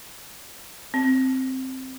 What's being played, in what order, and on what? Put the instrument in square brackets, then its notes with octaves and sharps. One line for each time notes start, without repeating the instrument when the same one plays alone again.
[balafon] C4